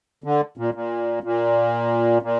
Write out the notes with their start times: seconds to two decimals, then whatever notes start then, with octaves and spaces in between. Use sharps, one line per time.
0.24 D3
0.57 A#2
0.74 A#2
1.23 A#2
2.22 A#2